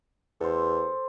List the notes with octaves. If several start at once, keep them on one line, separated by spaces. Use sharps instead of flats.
E2 A4 C5